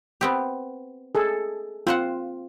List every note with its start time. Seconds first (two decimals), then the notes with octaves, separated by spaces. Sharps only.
0.21 B3 C4 G4
1.15 G#4 A4
1.87 C4 F4 C5 F#5